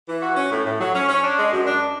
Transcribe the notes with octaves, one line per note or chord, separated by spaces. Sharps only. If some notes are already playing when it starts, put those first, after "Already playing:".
E3
F#4
C#4
A2
A2
F#3
C#4
C#4
D4
G#3
F#2
D4